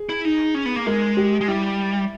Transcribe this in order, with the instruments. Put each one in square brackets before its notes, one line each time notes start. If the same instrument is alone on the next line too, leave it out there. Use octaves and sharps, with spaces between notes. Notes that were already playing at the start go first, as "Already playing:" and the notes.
Already playing: [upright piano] G#4
[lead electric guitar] E4
D#4
C#4
B3
A#3
[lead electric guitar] G#3 [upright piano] A#4
[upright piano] G4
[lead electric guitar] G#3
[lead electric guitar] G3 [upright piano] E4